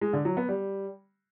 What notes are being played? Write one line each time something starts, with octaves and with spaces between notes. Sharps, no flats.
G#3
D3
F#3
B3
G3